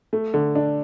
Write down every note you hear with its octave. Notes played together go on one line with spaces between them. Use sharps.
A3
D3
D4